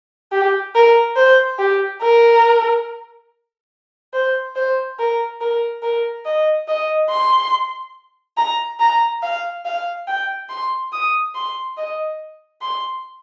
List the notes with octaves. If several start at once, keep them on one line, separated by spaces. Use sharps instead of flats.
G4
A#4
C5
G4
A#4
C5
C5
A#4
A#4
A#4
D#5
D#5
C6
A#5
A#5
F5
F5
G5
C6
D#6
C6
D#5
C6